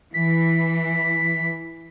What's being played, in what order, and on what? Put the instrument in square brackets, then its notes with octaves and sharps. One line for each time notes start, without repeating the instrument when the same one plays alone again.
[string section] E3 [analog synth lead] B6